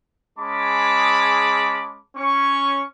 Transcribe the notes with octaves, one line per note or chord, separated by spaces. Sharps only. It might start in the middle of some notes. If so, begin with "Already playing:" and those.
G#3 C#4 G#4 A5 B5 D6
C#4 C#6